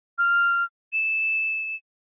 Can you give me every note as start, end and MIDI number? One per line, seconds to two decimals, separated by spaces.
0.18 0.64 89
0.93 1.75 100